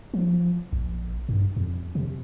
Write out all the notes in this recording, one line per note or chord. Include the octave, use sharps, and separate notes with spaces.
F3
A#1
G2
F2
C3